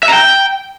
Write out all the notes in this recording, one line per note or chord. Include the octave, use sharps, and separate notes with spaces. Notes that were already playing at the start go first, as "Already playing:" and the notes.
E5
A#5
G5